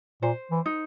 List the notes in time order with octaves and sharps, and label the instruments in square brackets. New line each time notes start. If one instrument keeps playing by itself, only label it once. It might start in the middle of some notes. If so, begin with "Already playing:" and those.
[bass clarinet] A#2 [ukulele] C5
[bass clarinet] E3
[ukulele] D#4